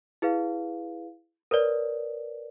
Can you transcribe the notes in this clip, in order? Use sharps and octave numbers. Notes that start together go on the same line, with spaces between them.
E4 G#4 B4 F5
A#4 B4 C#5 D5